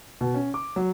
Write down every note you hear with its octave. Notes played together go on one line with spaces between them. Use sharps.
B2
C#4
D6
F#3